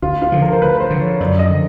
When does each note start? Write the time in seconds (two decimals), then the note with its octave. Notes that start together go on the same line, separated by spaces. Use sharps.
0.02 D2 F4
0.22 F4
0.32 D3 F3
0.42 A#4
0.52 C5
0.62 D2 B4
0.77 B4
0.80 C5
0.90 D3 F3
1.01 C#5
1.20 F#2 D5
1.39 D#5
1.50 D3 F3